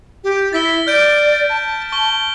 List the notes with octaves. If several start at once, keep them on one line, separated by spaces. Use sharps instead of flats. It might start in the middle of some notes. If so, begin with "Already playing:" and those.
G4
E4 A6 B6 G7
D5 F6 G6 D7
A5
C#6 G7